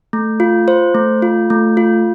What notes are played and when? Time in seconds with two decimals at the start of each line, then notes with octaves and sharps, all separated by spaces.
0.13 A3
0.40 F4
0.68 C5
0.95 A3
1.22 F4
1.50 A3
1.77 F4